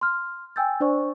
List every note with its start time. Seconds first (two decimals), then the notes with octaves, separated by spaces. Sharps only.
0.01 C6 F6
0.56 G5 G#5 E6 G6 A6
0.80 D4 C5 D5 C#6